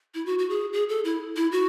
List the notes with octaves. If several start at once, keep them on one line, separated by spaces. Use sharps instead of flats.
E4
F#4
F#4
G#4
G#4
A4
E4
E4
F#4